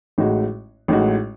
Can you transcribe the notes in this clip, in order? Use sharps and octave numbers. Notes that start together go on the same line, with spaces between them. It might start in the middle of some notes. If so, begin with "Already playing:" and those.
A1 A2 G#3 D#4 F#4
A1 A2 G#3 D#4 F#4